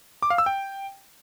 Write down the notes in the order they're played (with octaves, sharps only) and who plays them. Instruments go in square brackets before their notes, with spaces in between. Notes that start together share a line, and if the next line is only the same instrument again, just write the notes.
[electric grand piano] D6
F5
E6
G5